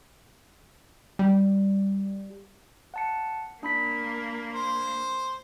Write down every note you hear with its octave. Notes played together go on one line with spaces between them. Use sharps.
G3
F#5 A5 C#7
A#3 D4 B5 B6
C5